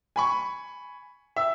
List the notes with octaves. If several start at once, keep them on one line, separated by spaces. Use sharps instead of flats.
G#5 B5 C#6
E5 E6